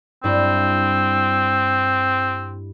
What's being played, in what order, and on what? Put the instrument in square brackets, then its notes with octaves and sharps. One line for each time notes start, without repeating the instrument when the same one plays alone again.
[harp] G2 E4 [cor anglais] C4